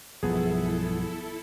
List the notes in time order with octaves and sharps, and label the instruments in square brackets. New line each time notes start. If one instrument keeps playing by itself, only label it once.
[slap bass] B1 G2 [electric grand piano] F3 B3 G#4 [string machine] E4 A4